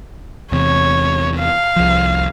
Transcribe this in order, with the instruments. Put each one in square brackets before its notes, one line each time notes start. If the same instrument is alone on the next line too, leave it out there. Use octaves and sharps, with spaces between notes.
[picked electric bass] E2 C3 [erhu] C#5
[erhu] F5
[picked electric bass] C2 F3